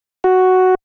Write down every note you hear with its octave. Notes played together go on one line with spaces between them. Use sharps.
F#4